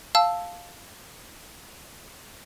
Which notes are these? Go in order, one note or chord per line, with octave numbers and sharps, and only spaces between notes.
F5 A5 E6